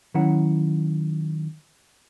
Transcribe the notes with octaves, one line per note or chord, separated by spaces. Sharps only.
D#3 F#3 C#4 E4 F#5 A#5